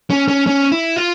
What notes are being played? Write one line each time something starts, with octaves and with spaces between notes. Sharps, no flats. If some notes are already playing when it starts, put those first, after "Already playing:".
C#4
C#4
C#4
E4
F4